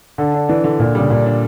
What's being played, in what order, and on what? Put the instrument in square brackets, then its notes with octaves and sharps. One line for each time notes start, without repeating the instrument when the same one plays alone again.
[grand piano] D3 [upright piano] A4
[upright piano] D4
[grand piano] E3 [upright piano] D4
[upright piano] D3
[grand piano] A#2 [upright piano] D4
[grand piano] C#3 [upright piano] G3
[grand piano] A#2 [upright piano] D4
[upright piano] D4